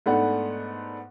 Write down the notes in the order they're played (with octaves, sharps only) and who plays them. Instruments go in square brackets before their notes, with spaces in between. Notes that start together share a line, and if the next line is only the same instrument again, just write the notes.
[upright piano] G#2 A3 B3 D4 F#5